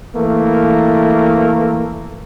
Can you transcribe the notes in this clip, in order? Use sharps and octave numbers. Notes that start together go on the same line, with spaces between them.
E3 A3 A#3